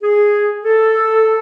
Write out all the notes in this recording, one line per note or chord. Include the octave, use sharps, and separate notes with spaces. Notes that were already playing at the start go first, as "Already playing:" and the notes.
G#4
A4